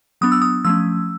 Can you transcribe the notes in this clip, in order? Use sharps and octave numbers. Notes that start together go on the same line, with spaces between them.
F#3 B3 D4 D#6
E6
D#6
F3 A3 C#4 E6